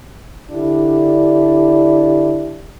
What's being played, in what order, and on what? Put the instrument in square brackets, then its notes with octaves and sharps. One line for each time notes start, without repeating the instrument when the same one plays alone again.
[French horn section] D3 D4 E4 G4